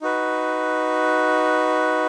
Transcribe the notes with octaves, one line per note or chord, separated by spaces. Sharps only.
D#4 F#4 B4